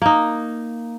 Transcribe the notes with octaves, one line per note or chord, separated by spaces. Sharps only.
A#3 D#4